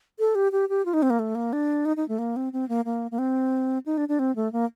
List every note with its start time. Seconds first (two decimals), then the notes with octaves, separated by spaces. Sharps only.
0.19 A4
0.35 G4
0.52 G4
0.69 G4
0.85 F4
0.93 D#4
1.02 C4
1.10 A#3
1.19 A3
1.35 A#3
1.53 D4
1.85 D#4
1.97 D#4
2.08 A3
2.18 A#3
2.36 C4
2.53 C4
2.69 A#3
2.85 A#3
3.11 A#3
3.19 C4
3.86 D#4
3.97 D4
4.09 D4
4.19 C4
4.36 A3
4.52 A#3